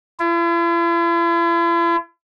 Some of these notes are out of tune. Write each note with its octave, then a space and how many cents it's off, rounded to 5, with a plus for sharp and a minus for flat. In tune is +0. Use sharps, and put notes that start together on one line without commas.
E4 +45